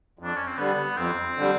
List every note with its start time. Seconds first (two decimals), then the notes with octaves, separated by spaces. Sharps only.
0.19 F2
0.24 D4
0.36 C#4
0.47 C4
0.58 D3 G3 B3
0.97 F2 C4
1.37 D3 G3